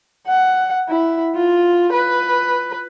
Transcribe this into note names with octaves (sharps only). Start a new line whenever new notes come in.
F#5
E4
F4
B4